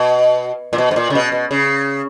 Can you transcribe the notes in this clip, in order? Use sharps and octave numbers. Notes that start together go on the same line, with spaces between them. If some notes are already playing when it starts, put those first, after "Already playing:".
Already playing: B2
A#2
B2
G#2
A#2
C#3
B2
B2
C#3